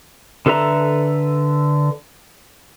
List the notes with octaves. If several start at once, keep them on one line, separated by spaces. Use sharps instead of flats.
D3 A4 B4 E5 A#5